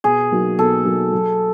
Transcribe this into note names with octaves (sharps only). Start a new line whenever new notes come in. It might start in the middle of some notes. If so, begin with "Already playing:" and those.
B2 G#4
F#3 A#3 D#4 F#4
B2 A4
F#3 A#3 D#4 F#4
F#3